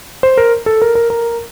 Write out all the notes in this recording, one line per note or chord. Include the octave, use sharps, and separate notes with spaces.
C5
A#4
A4
A#4
A#4
A#4